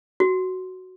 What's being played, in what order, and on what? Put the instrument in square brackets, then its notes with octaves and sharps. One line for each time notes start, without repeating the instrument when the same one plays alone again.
[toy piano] F#4